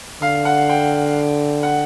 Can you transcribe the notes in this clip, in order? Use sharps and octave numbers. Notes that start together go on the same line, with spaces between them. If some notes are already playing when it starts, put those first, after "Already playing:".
D3 F5
F#5
G5
F#5